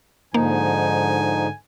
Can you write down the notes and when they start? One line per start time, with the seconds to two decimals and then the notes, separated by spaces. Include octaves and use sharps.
0.34 G#2 D3 F3 A#3 D#4 G#5